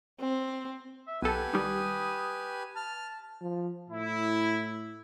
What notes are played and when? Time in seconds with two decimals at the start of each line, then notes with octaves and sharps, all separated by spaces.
0.20 C4
1.07 E5
1.22 B1 G4 A4 B4 F#5 G#5
1.53 D#3 G3 D#6
2.76 A5 F6
3.42 F3
3.90 A2 E4